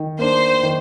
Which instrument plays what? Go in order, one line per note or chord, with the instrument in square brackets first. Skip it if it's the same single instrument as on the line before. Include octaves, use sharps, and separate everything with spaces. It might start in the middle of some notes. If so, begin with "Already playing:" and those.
Already playing: [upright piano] D#3
[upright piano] A#3 D4 [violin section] C5
[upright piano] D#3